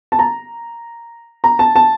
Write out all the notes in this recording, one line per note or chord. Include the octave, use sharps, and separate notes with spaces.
A5
A#5
A#5
A5
A5